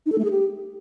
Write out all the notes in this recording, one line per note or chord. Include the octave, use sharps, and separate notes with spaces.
D#4
A4
A3
G#4
G4